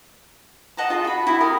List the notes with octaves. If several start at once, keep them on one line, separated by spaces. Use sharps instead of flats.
D#5 F#5 A5 A#5
F4 G#4
F#4 B5
E4 F#4 E5
G4 A#4 F5 D#6